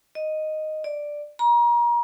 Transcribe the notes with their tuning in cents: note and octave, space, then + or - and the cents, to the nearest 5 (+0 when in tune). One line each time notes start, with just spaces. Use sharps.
D#5 -5
D5 +5
A#5 +35